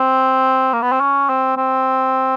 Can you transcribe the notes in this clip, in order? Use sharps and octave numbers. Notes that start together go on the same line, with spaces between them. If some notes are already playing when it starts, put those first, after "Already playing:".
Already playing: C4
A#3
B3
C4
C#4
C4
C4